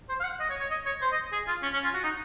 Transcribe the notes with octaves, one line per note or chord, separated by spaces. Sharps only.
C5
F5
F#5
D#5
C#5
C#5
D#5
C#5
C5
D#5
G#4
F4
C#4
C#4
F4
F#4
D#4